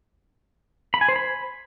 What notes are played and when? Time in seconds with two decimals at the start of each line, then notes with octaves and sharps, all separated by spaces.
0.94 B5
1.01 G#5
1.08 C5
1.16 B5